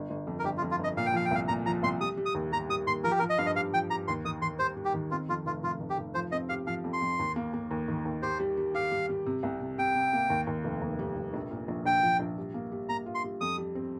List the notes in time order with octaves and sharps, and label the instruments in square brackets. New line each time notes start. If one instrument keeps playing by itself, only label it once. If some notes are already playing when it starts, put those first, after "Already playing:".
Already playing: [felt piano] G1
G1
F2
[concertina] A#4
[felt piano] G1 [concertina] G4
[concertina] F4
[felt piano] F2
[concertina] F4
[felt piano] G1 [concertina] D#5
[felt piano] A#2 [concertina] F5
[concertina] G5
[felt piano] F3 [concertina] F5
[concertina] G5
[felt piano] C2 [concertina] F5
[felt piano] A#2 [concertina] A#5
[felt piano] F3 [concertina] A#5
[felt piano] C2 [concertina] C6
[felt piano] G3 [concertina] D#6
[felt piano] G3
[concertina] D#6
[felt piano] D#2
[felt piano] G3 [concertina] A#5
[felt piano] G3 [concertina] D#6
[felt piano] D#2 [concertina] C6
[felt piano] F3 [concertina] A#4
[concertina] G4
[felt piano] F3 [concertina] A#4
[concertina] D#5
[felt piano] G2 [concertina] F5
[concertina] D#5
[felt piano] G4 [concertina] F5
[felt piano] F3 [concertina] G5
[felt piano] G4 [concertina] A#5
[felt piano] D#2 [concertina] C6
[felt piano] D#3 [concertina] D#6
[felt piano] D#3 [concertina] C6
[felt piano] G3 [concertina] C5
[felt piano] G3
[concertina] G4
[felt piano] D#3
[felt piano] C4 [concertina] F4
[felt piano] F2 [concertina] F4
[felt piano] F1 [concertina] F4
[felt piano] F1 [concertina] F4
[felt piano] F1
[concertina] G4
[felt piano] F1
[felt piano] F3 [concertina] C5
[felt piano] C4 [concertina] D#5
[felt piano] G4 [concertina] F5
[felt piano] F3 [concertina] F5
[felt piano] F2
[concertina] C6
[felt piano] F2
D#2
A#3
A#3
D#2
D#3
D#2
[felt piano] G4 [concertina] C5
[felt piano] G3
G3
[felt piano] G4 [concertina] F5
[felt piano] G3
G3
C3
C2
C3
[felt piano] C3 [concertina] G5
[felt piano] C3
A#3
D#2
D#2
F1
D#2
G3
F1
A#1
A#2
A#1
[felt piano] A#1 [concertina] G5
[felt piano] F3
A#1
G3
A#3
G3
[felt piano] A#3 [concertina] A#5
[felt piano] F4
[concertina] C6
[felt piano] G3
[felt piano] F2 [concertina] D#6
[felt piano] G3
C4